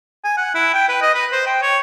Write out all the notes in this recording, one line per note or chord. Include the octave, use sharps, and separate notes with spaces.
G#5
F#5
E4
G5
B4
D#5
B4
C5
G5
C#5